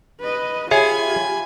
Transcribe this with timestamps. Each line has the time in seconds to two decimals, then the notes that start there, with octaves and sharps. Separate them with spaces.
0.21 B4 D#5
0.71 F4 G4 G#4 C#5 E5 G#5 B5